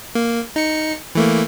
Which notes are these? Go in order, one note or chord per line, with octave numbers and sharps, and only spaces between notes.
A#3
D#4 C#7
E3 A3 A#3